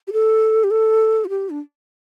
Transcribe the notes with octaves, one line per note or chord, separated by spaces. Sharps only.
G4
A4
G4
A4
F4
G4
D4